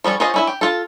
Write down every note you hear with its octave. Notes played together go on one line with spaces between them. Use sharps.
F3 G3 C#4 A4
F4 G#4 C5 C#5 D#5
C#4 E4 E5
G4
F4 A4